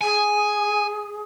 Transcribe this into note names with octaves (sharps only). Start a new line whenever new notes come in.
G#4 G#5